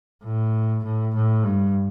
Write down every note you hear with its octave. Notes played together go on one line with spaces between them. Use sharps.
A2
A2
A2
G2